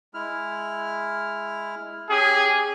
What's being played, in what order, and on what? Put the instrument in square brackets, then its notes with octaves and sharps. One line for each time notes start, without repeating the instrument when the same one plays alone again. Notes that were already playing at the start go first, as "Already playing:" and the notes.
[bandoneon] G#3 E4 F6
[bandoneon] C#4 G4 G5 [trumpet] G#4